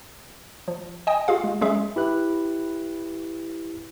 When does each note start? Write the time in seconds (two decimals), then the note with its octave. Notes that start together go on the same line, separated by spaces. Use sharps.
0.68 F3
1.07 D#5 G5 G#5 D#6
1.28 F4 G4 G#4 F5
1.44 G#3
1.61 F#3 G#3 C#4 G#4 E5
1.96 E4 G4 B4 F#6